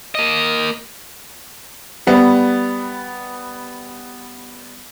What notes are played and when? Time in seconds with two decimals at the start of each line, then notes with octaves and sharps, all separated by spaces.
0.15 A#3 D#5
2.07 G3 B3